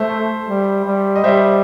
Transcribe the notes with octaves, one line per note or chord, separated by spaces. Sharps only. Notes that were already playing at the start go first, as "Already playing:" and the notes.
Already playing: A3 C5 E5
G3
G3
D#5
G3 C5 E5